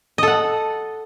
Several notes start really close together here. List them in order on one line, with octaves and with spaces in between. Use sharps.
D#5 A4 F#5